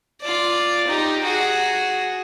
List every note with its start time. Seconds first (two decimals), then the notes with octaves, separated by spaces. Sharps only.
0.21 F4 D5
0.87 D#4 G4
1.24 F#4 G#4